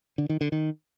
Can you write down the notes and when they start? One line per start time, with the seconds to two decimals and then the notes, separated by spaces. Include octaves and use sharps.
0.18 D3
0.29 D#3
0.41 D3
0.52 D#3